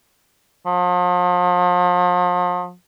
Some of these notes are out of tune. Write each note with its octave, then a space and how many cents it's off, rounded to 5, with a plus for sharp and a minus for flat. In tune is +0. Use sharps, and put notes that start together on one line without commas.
F3 +40